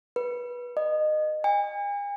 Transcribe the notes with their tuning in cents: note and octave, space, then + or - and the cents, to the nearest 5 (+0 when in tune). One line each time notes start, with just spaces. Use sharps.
B4 -20
D#5 -25
G#5 -40